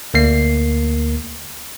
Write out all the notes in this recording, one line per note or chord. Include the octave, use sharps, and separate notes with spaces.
D2 A#3 C7